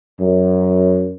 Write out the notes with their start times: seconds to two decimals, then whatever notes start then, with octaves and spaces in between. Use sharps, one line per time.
0.18 F#2